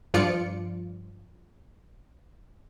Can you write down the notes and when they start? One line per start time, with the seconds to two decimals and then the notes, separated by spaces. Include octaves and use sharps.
0.14 G2 F3 F4 D5 C#7 D7